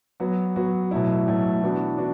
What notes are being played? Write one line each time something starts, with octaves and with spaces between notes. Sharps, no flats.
F#3 B3 F#4
F#3 B3 F#4
B2 F#3 A3 E4
B2 F#3 A3 E4
E3 B3 D4 F#4
E3 B3 D4 F#4